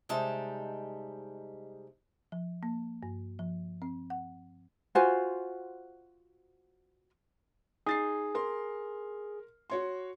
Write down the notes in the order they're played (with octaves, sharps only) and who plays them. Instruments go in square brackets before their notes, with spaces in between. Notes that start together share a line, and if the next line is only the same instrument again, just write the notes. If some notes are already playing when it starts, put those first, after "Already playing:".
[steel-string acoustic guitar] C3 G3 G#3 D#4 A5
[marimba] F3
A#3
G2
F3
C4
F#5
[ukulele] F4 F#4 C5 G#5
[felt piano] D#4 A6 C7 [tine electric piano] G#4
[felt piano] A#4 C6
F#4 C#5 C6